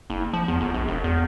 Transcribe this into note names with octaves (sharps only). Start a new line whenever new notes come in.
F#1
F3
E2
G1
A#1
E1
E2